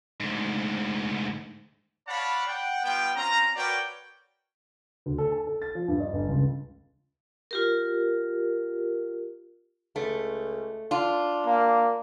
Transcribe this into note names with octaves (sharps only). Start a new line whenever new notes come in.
D2 G#2
C#5 D5 F5 F#5 A5 B5
F#5 G5
G3 B3 F4 G5
C4 C#4 F4 A#5
F#4 A#4 B4 C#5 D5 G5
D2
A4
A5
A4
A6
F3
G2
D#5
G1
C#2
F4 G4 A#4
C#2 A3
D4 F4
A#3